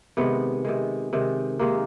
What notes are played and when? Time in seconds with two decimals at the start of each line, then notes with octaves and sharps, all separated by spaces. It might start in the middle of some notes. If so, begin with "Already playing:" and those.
0.17 C3 D#3 G#3 B3
0.65 C3 D#3 G#3
1.13 C3 D#3 G#3
1.59 C3 D#3 G#3 A#3